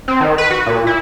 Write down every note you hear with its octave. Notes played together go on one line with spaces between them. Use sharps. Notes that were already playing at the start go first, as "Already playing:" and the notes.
C4
D#3
B4
F#4
A#2
E4